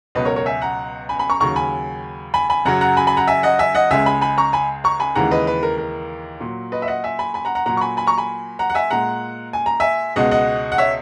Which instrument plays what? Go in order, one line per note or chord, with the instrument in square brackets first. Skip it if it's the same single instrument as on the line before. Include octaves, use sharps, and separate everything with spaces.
[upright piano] C#2 B2 F#3 B4 D#5
A#4 C#5
A#4 C#5
E5 G#5
F#5 A#5
G#5 B5
G#5 B5
A#5 C#6
D#2 C#3 F#3 A#5 C#6
G#5 B5
G#5 B5
G#5 B5
F#2 C#3 F#3 F#5 A#5
F#5 A#5
G#5 B5
G#5 B5
F#5 A#5
E5 G#5
D#5 F#5
E5 G#5
D#5 F#5
C#2 C#3 G#3 E5 G#5
G#5 B5
G#5 B5
A#5 C#6
G#5 B5
A#5 C#6
G#5 B5
D#2 C#3 E3 G#3 F#5 A#5
B4 D#5
B4
A#4
A#4
A#2 F#3
B4 D#5
E5
D#5 F#5
E5 G#5
G#5 B5
G#5 B5
F#5 A#5
F#5 A#5
A#2 F#3 F#5 A#5
C#6
G#5 B5
G#5 B5
A#5 C#6
G#5 B5
F#5 A#5
F#5
E5 G#5
A#2 G#3 F#5 A#5
G#5
A#5
E5 G#5
C#2 B2 G#3 D#5 F#5
D#5 F#5
F#5
C#5 E5